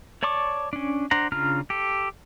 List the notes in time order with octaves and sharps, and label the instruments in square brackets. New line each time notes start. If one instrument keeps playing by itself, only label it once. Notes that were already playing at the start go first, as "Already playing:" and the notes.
[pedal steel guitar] C#5 D5 A5 C#6 D6
C#4 D4
D4 C5 F#5 A#5
C#3 D4 F4 A#5 F6
G4 A4